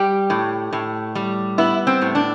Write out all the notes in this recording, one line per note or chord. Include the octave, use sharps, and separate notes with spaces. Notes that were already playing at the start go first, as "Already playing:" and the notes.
Already playing: G3 G4
A2
A2
G3
B3 E4
C4
A2
D4